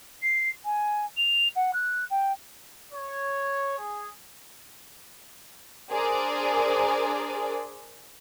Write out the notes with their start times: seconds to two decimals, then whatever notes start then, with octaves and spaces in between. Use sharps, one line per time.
0.22 C7
0.65 G#5
1.17 F7
1.56 F#5
1.73 F#6
2.11 G5
2.94 C#5
3.79 G#4
5.91 D4 G#4 A#4 C5 D5